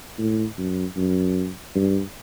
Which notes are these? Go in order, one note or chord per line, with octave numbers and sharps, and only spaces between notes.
A2
F#2
F#2
G2